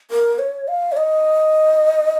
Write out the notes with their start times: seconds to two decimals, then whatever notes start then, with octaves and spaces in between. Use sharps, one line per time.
0.11 A#4
0.39 C#5
0.68 F5
0.92 C#5
0.97 D#5